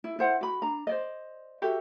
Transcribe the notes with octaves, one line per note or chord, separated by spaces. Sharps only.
E4
E4 C5 F#5
F#4 B5
D4 A#5
C5 D5 D#5
F#4 G4 A4 E5